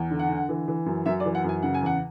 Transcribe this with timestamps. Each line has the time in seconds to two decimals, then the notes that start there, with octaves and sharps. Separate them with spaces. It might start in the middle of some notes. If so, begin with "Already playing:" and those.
Already playing: E2
0.11 D3
0.19 F#5
0.29 D3
0.49 E3
0.68 E3
0.86 F#2
1.06 F#2 E5
1.20 D5
1.25 E3
1.35 F#5
1.44 F#2 G#5
1.63 C#3 F#5
1.74 G#5
1.82 E2 F#5